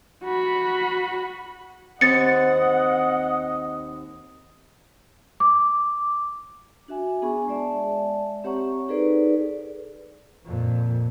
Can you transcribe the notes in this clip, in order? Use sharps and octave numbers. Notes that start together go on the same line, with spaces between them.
F#4 B5
D#2 C4 D#5 F#5 A6 C#7
D6
D4 F#4 E5 G#5
B3 D4 G#4 G#5 B5 C#6
G#3 D5 E5 A5
C4 G4 C#5 F#5 A#5 C#6
D#4 G#4 A4 B4 C5 D5
F2 A#2